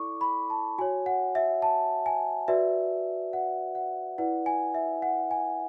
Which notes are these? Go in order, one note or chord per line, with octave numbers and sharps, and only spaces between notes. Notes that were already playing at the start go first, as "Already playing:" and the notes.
Already playing: E4 A4 D5 C#6 D6
B5
A5
F#4 C#5 G#5
F#5
E5
A5
G#5
F#4 B4 D5 E5
F#5
F#5
E4 B4 D5 F#5
G#5
E5
F#5
G#5